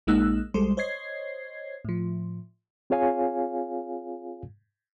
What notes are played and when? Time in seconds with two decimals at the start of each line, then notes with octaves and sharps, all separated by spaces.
0.07 A#1 G#3 A#3 D#4 E6 F#6
0.54 B1 G3 G#3 A4 C5 C6
0.77 C5 C#5 D#5 G#6 C7
1.85 A2 F3
2.90 C4 F4 G#4 C#5 F5 G#5